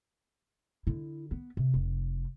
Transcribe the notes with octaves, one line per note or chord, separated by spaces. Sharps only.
D3 E4
B3
C3
F1